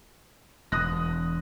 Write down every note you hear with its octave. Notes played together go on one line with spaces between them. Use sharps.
E1 D#6 F#6 A#6